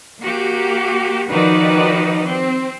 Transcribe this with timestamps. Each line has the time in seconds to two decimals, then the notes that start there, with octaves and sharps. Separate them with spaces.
0.20 A#3 F#4 G4
1.28 D#3 F3 D#4 F#4 B4 D5
2.27 C4